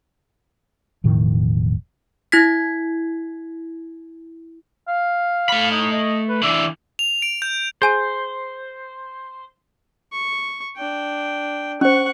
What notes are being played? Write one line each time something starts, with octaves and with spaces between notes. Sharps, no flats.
E1 A2 D#3 F3
E4 G#6 B6
F5
A3 B5
D#4
D#5
B4
E3 D4 E5
F7
D7
G6
G#4 C5 G#5 D#7
C#6
D4 G5
C#4 C5 F#5 C#6